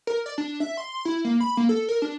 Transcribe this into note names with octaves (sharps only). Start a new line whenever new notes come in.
A#4
D5
D4
E5
C6
E4
A#3
B5
A#3
A4
A#4
D4